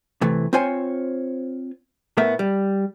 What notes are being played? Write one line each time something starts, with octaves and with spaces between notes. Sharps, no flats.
C3 E3 A3
C4 F4 C5 C#5 G#5
A2 A3 B3 A#4 E5
G3